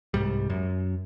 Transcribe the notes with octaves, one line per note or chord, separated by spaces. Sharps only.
C2 G#2 G3
F#2